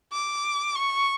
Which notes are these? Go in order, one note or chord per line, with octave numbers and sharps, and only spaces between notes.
D6
C#6